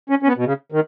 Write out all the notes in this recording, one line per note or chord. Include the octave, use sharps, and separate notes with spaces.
C#4
C#4
B3
B2
C#3
D#3